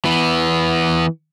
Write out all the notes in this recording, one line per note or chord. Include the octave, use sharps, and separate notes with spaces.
E3 B3